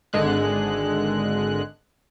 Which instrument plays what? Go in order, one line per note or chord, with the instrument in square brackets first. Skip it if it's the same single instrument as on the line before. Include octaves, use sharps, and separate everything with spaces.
[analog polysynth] G#1 D3 G#3 F#6